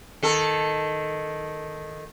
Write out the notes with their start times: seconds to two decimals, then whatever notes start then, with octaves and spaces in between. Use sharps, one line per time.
0.23 D#3 A4